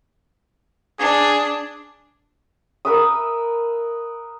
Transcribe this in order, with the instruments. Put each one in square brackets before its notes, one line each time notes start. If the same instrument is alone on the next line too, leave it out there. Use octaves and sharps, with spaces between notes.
[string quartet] D4 [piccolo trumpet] G#4
[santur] A#4 B4 E5 D#6